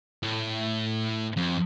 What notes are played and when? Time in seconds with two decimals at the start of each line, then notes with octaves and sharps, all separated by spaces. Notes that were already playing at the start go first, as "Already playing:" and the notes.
0.23 A2
1.37 F2